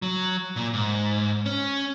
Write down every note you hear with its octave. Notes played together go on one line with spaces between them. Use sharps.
F#3
A#2
G#2
C#4